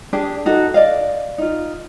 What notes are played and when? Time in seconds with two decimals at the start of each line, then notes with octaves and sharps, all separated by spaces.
0.13 D4 G4 G#4 A5
0.46 D#4 F#4 A4
0.74 D5 D#5 F5
1.38 D#4 F4